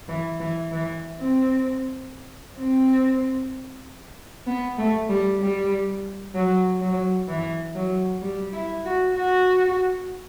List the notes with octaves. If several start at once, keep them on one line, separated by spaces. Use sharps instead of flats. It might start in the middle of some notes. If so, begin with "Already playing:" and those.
E3
E3
E3
C4
C4
B3
A3
G3
G3
F#3
F#3
E3
F#3
G3
E4
F#4
F#4